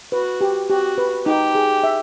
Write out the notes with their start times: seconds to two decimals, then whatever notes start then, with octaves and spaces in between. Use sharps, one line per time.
0.12 F#4 B4
0.41 G4
0.69 F#4 G4
0.98 B4
1.26 D#4 G4
1.55 G#4
1.84 E5